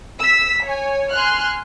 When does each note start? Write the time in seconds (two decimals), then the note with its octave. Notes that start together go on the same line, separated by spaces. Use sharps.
0.20 E6 B6
0.65 C#5 G#5
1.11 G#5 C6 F6 F#6